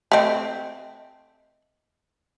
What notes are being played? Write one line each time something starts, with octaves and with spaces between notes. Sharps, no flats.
A3 C4 D#5